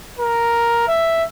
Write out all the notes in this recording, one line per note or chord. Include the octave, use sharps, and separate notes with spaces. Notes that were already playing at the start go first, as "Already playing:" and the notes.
A#4
E5